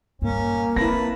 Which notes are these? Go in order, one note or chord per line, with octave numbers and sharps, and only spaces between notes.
G2 A#2 A#3 C#4
C4 E4 B4 A5 A#6